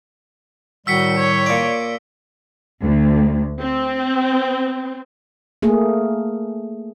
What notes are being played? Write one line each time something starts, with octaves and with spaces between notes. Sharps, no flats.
A2 D#3 G3 F#4 E6 B6 C#7
C#5
A#2 D5
D2
C4
A3 A#3 G#4